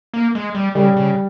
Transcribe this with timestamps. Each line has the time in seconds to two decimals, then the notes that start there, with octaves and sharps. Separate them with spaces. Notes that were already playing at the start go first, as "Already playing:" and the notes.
0.14 A#3
0.35 G#3
0.55 G3
0.75 C#3 G3
0.97 C#3